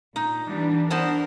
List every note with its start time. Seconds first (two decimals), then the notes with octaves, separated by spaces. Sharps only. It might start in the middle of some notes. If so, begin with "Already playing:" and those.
0.16 A#2 D#4
0.47 E3 G3 B3 D4
0.90 E3 B3 A#4 C5 A5